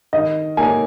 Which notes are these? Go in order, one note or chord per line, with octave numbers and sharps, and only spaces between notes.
D#3 D#5
A#3 D#4 A#4 C#5 G#5